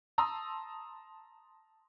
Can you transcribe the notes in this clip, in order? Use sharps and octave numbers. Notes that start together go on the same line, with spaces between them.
A5 A#5 C6 D#6 E6